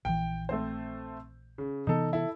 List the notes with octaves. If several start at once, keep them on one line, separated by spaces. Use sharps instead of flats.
A#1 E3 G5
A3 C4 C5
C#3
C3 E3 B3 D#4 A4
E4 A4